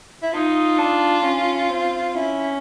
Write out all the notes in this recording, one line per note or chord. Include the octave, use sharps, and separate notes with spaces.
E4
D#4 F4
D4
C#4
C4
C#4 E4